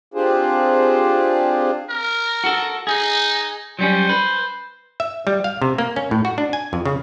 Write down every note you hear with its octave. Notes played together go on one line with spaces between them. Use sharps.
C4 D4 F4 G4 G#4 C5
A#4
F#4 A4
D#4 G#4
F#3 G3 C#4 C5
B4
E5
G3
F5
C3
A#3
C#4
A2
F#4
D4
G#5
F2
C#3